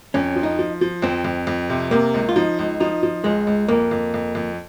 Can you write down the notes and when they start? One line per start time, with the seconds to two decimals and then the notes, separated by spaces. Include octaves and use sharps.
0.14 F2 C#4
0.36 F3
0.43 D#4
0.59 F3
0.81 F3
1.02 F2 C4
1.24 F2
1.47 F2
1.70 C3
1.91 C3 A#3
2.14 C#2
2.29 F4
2.36 F3 D#4
2.59 C#2
2.80 F3 D#4
3.03 F3
3.24 C#2 G#3
3.47 C#2
3.68 F2 A#3
3.91 F2
4.14 F2
4.35 F2